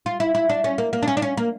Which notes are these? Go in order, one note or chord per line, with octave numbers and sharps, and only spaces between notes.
F4
E4
E4
D4
C#4
A#3
A#3
D4
C#4
D4
C#4
A#3